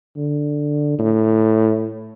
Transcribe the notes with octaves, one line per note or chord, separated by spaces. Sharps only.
D3
A2